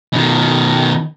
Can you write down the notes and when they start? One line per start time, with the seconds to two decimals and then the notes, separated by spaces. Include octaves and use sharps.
0.13 B2 D#3